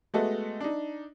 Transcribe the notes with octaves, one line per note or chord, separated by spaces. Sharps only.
G#3 A3 B3 F#4 A4 D#5
D4 D#4